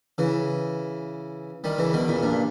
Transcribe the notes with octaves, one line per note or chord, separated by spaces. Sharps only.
C#3 E3
D#3 G3
C#3 E3
B2 D#3
A#2 C#3
G2 A#2